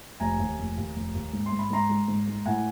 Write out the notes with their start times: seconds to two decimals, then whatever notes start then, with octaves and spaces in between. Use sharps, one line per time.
0.20 F1 G#5 A#5
0.39 D#2
0.58 F1
0.77 D#2
0.96 F1
1.14 D#2
1.33 G#2
1.46 C6
1.52 G#2
1.59 B5
1.70 G#2 A#5 C6
1.89 G#3
2.08 G#2
2.27 G#3
2.46 A2 F#5 G#5